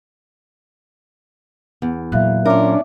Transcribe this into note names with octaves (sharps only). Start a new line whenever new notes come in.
E2
A#2 F#3 E5 F5 F#6
C#4 D4 F4 A#4 E5 D6